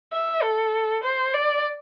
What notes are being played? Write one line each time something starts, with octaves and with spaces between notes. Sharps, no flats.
E5
A4
C5
D5